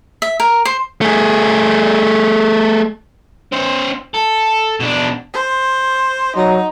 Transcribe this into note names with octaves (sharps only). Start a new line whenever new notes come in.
E5
A#4
C5
A3 G#4
C#4 C5
A4
B2 D4
C5
F#3 D#4